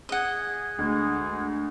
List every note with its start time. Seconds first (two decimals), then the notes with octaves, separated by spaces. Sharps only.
0.09 G#4 D#5 F#5
0.79 D2 G#3